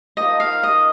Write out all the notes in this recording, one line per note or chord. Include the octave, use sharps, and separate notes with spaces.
F3 A#3 D#4 G4 D#5
F5
D#5